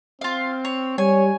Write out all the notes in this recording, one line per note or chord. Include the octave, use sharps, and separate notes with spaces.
C4 F4 F5
C#5
G3 C#5 G#5